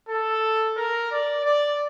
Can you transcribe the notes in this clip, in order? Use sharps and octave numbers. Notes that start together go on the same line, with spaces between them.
A4
A#4
D5
D5